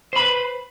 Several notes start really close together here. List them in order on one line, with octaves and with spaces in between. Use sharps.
C5 B5 B4